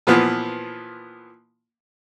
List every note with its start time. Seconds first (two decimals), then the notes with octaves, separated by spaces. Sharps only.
0.07 A#2 E3 F3 B3